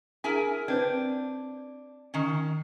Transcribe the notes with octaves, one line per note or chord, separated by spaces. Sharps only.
D4 E4 G#4 A#4 G#5
C4 D4 B4 C5
D#3 C#4